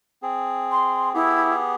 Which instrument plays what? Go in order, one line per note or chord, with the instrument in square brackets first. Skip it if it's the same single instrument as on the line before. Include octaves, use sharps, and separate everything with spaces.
[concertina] C4 G#4
[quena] C6
[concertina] B3 G4 G#4 [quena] E4